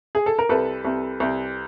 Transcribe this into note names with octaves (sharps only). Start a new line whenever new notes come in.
G#4
A4
A#4
C2 A4 B4
C2
C2